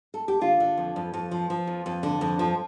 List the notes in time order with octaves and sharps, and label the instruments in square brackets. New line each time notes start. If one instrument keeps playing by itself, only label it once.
[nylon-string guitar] A4
G4
D3 F4
D3
F2
F2
F2
F3
F3
F2
F2
D3
F2
F3